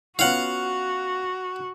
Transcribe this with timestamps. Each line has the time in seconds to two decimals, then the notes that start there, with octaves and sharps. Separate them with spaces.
0.19 B3 C#4 F4 F#4 F5 F#5